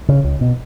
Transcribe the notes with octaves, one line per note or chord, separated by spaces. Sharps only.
C#3
C#2
B2